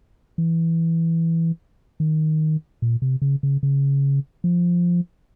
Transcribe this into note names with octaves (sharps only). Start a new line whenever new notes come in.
E3
D#3
A#2
C3
C#3
C#3
C#3
F3